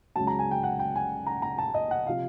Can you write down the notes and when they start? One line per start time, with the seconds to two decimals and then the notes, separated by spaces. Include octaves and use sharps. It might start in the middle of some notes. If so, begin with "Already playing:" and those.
0.16 C#2 C#3 F#3 A5
0.27 A#5
0.39 G#5
0.51 G5
0.63 F#5
0.79 G5
0.95 G#5
1.26 A#5
1.42 A#5
1.58 A5
1.74 D#5
1.91 F#5
2.06 C3 F3 F5